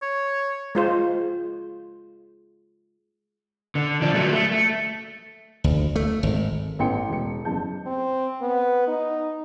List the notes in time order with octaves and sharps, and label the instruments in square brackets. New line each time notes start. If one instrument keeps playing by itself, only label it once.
[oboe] C#5
[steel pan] G#3 F4 C5
[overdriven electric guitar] D3
F3 D4
F#3 A3
A3
A3
[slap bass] D2
A3
G#1
[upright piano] A1 B3 A4 G5 C6 C#7
E1 C#7
F#1 E2 A5 G6
[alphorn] C4
B3
D#4